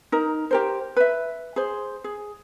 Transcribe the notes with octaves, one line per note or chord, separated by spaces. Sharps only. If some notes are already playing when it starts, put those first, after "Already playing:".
D#4 A#4
G4 A#4 C5
B4 E5
G#4 C5
G#4